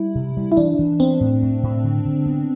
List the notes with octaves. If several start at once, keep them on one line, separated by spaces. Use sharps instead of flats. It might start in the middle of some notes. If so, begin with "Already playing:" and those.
Already playing: G3 E4
C3
G3
E4
E3 D4
E3
B3 C4
A2
A2
A2
D3
D3
B3